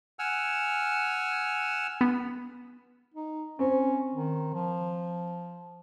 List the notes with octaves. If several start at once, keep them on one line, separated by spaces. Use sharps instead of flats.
F#5 G#5 E6 F6
B3
D#4
C4 C#4
D#3
F3